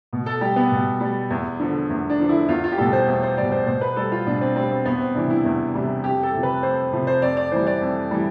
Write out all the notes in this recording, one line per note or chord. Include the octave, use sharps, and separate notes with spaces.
B2
A4
G3 G4
B3
B2
G3
E2
D3 F3
E2
D4
D3 F3
E4
E2 F4
F4
G4
B2 G3 A4
C5
E2
C5
B2 G3 D5
C5
B2 C5
B4
G3 A4
F4
B2 D4
C4
G3 C4
C4
E2 B3
C4
C3 E3 G3 D4
E4
E2
C3 E3 G3
F2 G4
A4
C3 F3
B4
F2 C5
C3 F3
C5
F2 D5
D5
E3 G3 C5
D5
F2
E3 G3